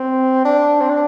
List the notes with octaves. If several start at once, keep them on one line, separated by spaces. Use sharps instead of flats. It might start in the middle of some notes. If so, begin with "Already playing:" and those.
Already playing: C4
D4
C4
D4